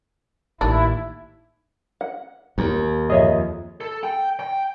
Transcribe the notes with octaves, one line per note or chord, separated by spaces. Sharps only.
A1 D#2 D4 E4
F#5
D#2
F2 G#4 C#5 D#5 E5
A4
G5
G5